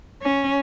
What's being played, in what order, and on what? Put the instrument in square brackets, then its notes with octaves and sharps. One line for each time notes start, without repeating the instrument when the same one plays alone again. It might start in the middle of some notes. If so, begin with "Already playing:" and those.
[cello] C#4